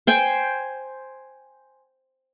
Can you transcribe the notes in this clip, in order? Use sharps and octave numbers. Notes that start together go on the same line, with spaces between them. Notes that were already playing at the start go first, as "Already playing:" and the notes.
C5 G5 G#5